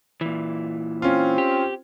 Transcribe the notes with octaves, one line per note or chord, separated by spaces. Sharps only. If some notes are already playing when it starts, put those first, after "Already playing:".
A#2 E3
C4 C#4 F4
G4